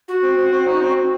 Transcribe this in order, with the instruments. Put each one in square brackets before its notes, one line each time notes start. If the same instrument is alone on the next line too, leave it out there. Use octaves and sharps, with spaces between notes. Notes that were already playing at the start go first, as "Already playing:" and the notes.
[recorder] F#4
[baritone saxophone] C4
C4
C4
D#4
C4
C4